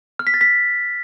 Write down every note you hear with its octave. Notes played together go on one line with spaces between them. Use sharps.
F6
B6
A6
B6